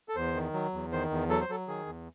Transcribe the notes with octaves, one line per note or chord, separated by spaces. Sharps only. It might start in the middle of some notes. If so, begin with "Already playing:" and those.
A4
E2 C5
D#3
F#3
E2
D#3 C5
E2
F#3 A4
C5
F#3 A4
D#3 G#4
E2